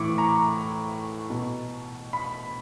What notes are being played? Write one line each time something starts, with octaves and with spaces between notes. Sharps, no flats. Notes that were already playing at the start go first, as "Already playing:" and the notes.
Already playing: A2 E3 C#6 D6
A#5
B2
B5